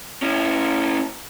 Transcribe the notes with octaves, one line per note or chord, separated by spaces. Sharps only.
C#4 E4